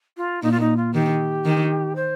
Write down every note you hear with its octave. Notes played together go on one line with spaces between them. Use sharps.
F4
A#2 D#4
F4
D#4
F4
D#3 G4
D#3
C5